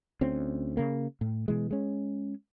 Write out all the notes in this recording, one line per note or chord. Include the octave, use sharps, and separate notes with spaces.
D2 C4 C#4
C#3 A#3
A2
B2 E3 G#3
G#3 C#4